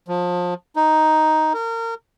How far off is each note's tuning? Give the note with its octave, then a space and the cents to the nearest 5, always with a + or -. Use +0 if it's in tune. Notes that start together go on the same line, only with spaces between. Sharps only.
F3 +25
D#4 +5
A#4 -30